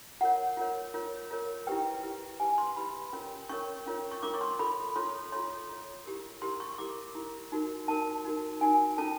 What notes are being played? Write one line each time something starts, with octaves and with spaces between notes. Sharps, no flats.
F4 A#4 C#5 F#5
F4 A#4 C#5
F4 A#4 C#5
F4 A#4 C#5
E4 G4 B4 G5
E4 G4 B4
E4 G4 B4 G#5
C6
E4 G4 B4 B5
C#4 F4 A#4 C#5
C#4 F4 A#4 C#5 C#6
C#4 F4 A#4 C#5
C#6
C#4 F4 A#4 C#5 D6
C#6
C6
F4 A4 C#5 B5
F4 A4 C#5 C6
F4 A4 C#5 C6
F4 A4 C#5
E4 G4 A#4
E4 G4 A#4 C6
C#6
E4 G4 A#4 D6
E4 G4 A#4
D#4 F#4 A#4
D#4 F#4 A#4 A5
D#4 F#4 A#4
D#4 F#4 A#4 G#5
C#4 F4 A4 C5 A5